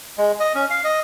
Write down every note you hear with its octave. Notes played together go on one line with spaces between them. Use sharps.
G#3
D#5
C#4
F5
D#5